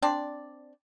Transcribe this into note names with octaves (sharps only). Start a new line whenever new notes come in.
C4 D4 D5